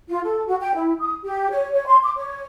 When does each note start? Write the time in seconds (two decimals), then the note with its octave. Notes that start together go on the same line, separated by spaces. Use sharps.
0.08 F4
0.24 A4
0.47 F#4
0.60 G5
0.74 E4
0.99 D#6
1.23 G4
1.50 C#5
1.72 C#5
1.87 C6
2.03 D6
2.16 C#5